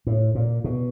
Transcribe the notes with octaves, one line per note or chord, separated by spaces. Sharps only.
A2
A#2
B2